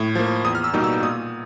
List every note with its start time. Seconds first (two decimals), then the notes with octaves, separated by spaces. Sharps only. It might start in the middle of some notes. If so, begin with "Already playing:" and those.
Already playing: A2
0.15 F3 A#3
0.44 E2 D#6
0.55 F6
0.64 E6
0.73 B2 G3 A#3 D#4
0.84 E6
1.03 A#2 D#6